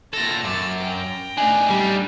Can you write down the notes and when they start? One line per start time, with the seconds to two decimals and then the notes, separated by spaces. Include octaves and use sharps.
0.13 A#2 A4 A6 A#6
0.44 F#2 D6 E6 A6
0.80 A#4 G5 A#5
1.37 A2 D4 D#4 G#5
1.70 G3